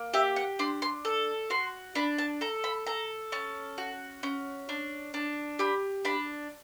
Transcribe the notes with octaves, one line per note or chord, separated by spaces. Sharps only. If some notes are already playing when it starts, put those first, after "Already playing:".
Already playing: A#3
G4 E5
F#5
D4 C6
C6
A4
F#4 C6
D4 B5
A5
A4 A#5
B5
A4 A#5
C#4 A5
F#4
C#4
D4
D4
G4 B5
D4 B5